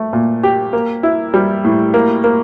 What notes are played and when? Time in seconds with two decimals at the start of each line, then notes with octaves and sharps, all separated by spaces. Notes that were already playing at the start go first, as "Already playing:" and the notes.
Already playing: A3
0.13 A#2
0.43 G4
0.73 A#3
1.03 E4
1.34 G3
1.65 A2
1.94 A#3
2.24 A#3